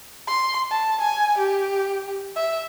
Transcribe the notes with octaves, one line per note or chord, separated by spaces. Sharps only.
C6
A5
G#5
G4
E5